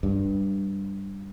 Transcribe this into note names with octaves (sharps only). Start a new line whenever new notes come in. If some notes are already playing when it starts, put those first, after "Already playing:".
G2